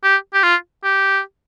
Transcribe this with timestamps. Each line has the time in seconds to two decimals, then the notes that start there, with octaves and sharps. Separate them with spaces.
0.04 G4
0.34 G4
0.43 F4
0.84 G4